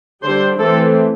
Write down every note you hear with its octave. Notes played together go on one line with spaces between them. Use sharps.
D3 G3 D4 C5
E3 A3 C4 A4